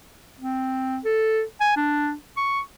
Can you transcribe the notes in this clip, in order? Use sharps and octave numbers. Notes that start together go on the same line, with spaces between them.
C4
A4
G#5
D4
C#6